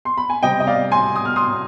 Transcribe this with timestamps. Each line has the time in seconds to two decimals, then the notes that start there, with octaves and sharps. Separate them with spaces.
0.05 C6
0.17 B5
0.30 G#5
0.43 C3 G3 C4 D#5 G5
0.60 D#5
0.67 D5 F5
0.92 G#5 C6
1.16 D#6
1.25 F6
1.36 C6 D#6
1.52 D#6